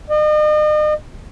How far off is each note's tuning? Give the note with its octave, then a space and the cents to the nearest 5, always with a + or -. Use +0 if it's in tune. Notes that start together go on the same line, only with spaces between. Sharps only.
D#5 -40